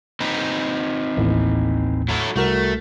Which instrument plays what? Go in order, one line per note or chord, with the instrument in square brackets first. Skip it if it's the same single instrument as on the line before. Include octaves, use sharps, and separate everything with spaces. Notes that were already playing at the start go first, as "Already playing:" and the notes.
[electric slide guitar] C4 D#4 B4
[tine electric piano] A1 D#2 A2
[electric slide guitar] F#3 E4 A4
[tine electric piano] C2 F#4 A#4 [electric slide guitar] A3